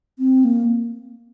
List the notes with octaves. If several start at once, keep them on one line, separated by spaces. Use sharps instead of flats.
C4
A#3